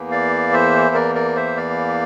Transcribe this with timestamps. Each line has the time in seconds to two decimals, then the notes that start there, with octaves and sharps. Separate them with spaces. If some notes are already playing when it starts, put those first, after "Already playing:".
Already playing: E2 E3 A#3
0.11 D5 F5
0.53 C5 E5
0.95 A#4 D5
1.15 A#4 D5
1.36 C5 E5
1.57 D5 F5